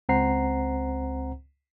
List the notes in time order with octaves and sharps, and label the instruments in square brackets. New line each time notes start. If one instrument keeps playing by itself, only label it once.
[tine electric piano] C#2 C4 C5 F#5 A#5 C7